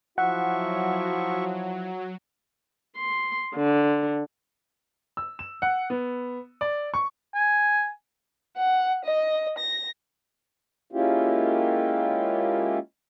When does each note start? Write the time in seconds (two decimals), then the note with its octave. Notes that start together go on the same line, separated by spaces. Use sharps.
0.18 F3 F#3 E4 F#4 E5 F#5 C#6
2.97 C6
3.55 D3
5.17 E6
5.39 E7
5.62 F#5
5.90 B3
6.61 D5
6.94 C#6
7.35 G#5
8.57 F#5
9.04 D#5
9.57 A#6
10.93 G#3 A#3 C#4 E4 F4 G4